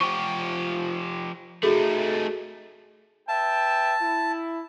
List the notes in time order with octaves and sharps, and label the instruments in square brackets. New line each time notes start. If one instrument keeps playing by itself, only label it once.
[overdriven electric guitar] F3 G4 [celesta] C#6
[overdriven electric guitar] A3 D#4 [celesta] F#4 G#4 A4
[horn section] B4 E5 G5 [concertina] A5
[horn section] E4